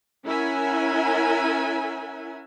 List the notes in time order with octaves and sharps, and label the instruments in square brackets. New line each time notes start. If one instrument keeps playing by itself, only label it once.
[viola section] C#4 E4 A#4 E5 F#5 G#5